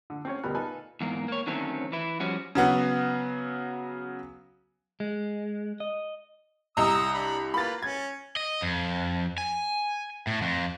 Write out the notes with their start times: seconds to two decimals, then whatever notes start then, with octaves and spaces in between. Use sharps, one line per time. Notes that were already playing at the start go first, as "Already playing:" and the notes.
0.10 D3
0.25 C4 C#4 C#5
0.43 D2 B2 G3 A#4 B5 F#6
0.55 D#4 F4 A4 B4 G#5
1.01 E2 G#2 A#3
1.28 A#3 C#5
1.47 D3 D#3 F#3 A3 C4 C#4
1.92 E3 E4
2.20 F3 G3 C#4 F#4
2.55 C#3 F#3 B3 F#4
5.00 G#3
5.80 D#5
6.77 C2 D#5 A#5 D#6 E6
7.13 D4 B5
7.54 A#3 F4 B4 B5 A6
7.82 C#4 G#6
8.36 D#5
8.62 F2
9.38 G#5
10.27 A2
10.42 F2